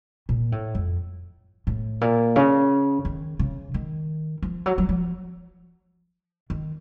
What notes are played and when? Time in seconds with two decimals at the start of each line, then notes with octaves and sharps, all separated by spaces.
0.29 A#2
0.52 A2
0.75 F2
1.67 A2
2.01 A#2
2.36 C#3
3.05 D#3
3.39 C#3
3.74 D#3
4.43 F3
4.66 F#3
4.78 F#3
4.89 F3
6.50 D#3